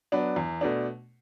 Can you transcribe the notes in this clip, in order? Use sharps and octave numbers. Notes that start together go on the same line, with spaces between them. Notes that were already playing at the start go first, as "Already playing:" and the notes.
F#3 B3 D4
E2
B2 A3 D4